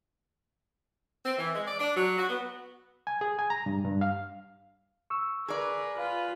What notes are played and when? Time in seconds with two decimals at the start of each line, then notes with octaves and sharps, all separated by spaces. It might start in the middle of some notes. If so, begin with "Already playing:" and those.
1.25 C4
1.38 E3
1.55 G#3
1.67 D5
1.80 D4
1.96 F#3
2.18 F#4
2.29 B3
3.07 G#5
3.21 G#4
3.39 G#5
3.50 A#5
3.66 G2
3.84 G2
4.01 F5
5.10 C#6 E6
5.48 G#4 A#4 B4 D5
5.97 F4 B4 F5 B5